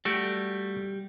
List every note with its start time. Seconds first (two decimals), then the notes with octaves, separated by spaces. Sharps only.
0.05 G3 A3 F#4 D5